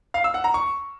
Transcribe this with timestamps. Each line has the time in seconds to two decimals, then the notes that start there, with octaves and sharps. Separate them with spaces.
0.14 F5
0.24 E6
0.34 F#5
0.44 A#5
0.54 C#6